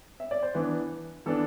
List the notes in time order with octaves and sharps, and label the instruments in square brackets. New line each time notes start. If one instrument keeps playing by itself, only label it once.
[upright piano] E5
D5
C5
E3 B3 D4 B4
E3 B3 D4 A4